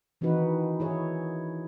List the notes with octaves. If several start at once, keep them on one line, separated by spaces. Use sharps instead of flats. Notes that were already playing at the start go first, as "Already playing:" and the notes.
D#3 E3 C4 D#4 F#4 B4
E4 G#4 C#5